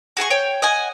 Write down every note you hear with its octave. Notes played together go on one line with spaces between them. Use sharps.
F#4 G#4 G#5 C#6
C#5 G5
D#5 F#5 G#5